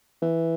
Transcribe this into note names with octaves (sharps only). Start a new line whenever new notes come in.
E3